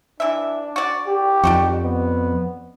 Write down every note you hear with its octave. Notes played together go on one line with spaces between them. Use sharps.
E3 D4 E5
F#4 D5
G4
F2 D4 D#4 F#4
B3